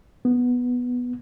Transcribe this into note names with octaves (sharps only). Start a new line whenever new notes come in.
B3